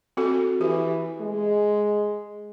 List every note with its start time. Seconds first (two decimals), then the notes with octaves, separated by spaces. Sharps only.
0.17 C4 F#4 A4
0.61 E3 G4
1.21 G#3